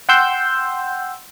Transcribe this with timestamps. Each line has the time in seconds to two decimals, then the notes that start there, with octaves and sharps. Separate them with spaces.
0.09 F#5 G5 C6 E6 G6